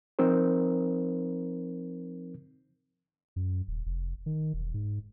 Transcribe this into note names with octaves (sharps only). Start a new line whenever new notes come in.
F3 C4 D#4 A#4 C5
F#2
D#1
F1
D#3
E1
G#2